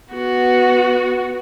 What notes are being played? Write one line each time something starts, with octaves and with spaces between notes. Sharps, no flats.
B3 F#4